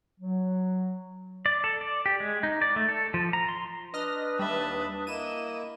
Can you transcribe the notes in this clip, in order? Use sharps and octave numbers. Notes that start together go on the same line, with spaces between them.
F#3
D5
A4
D5
G4
G#3
D#4
D5
A3
A4
F3
A#5
C6
D4 B4 D#5 D#6 F6 A#6
D#2 G3 E5 A5 B5
A#3 E4 D#5 D#7 E7